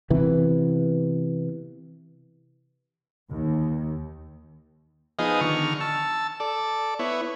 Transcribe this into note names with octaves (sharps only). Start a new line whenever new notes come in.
C3 E3 B3
D#2
F3 B3 D#4 G#4 D#5 F5
D3 D#3 C#6 F6
A5 E6
A4 D5
B3 E4 C#5